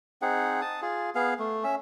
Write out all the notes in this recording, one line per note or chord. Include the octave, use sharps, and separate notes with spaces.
C4 D#4 G#4 F#5
A5 D#6
F4 G#4
B3 G#4 F5
A3
C#4 E5